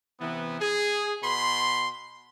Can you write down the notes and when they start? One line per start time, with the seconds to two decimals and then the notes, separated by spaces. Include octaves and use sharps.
0.20 C3 E3 B3
0.61 G#4
1.23 B2 B5 C6